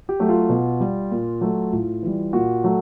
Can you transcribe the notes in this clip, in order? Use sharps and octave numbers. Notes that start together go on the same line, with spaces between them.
G4
F#3 A3
F4
B2
G3
A#2
F#3 A3
A2 F4
E3 G3
A#2 F#4
F#3 A3